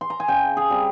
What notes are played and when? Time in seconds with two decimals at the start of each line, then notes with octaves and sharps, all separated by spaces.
0.01 C6
0.10 A#5
0.20 G#5
0.28 C#3 G5
0.57 G#4
0.70 G3 C4